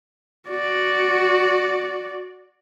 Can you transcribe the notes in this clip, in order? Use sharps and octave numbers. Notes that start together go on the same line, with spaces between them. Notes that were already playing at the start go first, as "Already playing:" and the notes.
F#4 D5